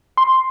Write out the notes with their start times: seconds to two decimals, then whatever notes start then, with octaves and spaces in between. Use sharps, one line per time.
0.17 C6